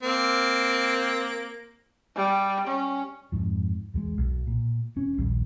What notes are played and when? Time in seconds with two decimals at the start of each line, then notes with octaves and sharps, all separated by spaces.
0.03 A#3 C4
2.16 G3
2.67 C#4
3.32 F2 G#2 F3
3.94 E2 G3 G#3
4.18 B1
4.47 A#2
4.96 E1 C#4
5.18 A#1 D#2 G3